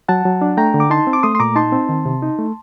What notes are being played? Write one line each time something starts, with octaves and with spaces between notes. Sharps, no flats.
F#3 F#5 A5
F#3
D4
A3 G5 A#5
D3
D6
D#4 A5 C6
C4
D6
A3 C6 D#6
C6
A#2 A#5 D6
D#4 A5 C6
C4
D#3
C3
D#4
A3